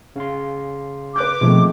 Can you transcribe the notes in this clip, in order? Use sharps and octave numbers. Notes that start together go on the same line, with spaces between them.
C#3 F5 C6
B4 D6 F#6 G6
B2 D#3 F3 G#3 A3 C4